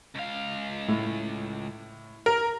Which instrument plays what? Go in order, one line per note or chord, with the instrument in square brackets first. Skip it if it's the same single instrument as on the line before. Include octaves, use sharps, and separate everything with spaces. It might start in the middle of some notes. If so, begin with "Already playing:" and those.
[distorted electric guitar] C#2 F5
[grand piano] A2
[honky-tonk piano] A#4